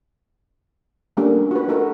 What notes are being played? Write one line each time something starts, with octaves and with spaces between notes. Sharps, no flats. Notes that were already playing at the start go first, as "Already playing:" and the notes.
G3 A3 A#3 C#4 D4 G4
F#4 B4
A3 D#4 F#4 A4 A#4